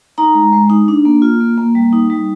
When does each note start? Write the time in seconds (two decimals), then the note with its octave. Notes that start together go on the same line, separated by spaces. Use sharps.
0.18 D#4 A#5
0.35 G#3
0.53 G#3
0.70 D#4
0.88 D4
1.05 A#3
1.22 F4
1.41 A#3
1.58 A#3
1.75 G3
1.93 D#4
2.10 G3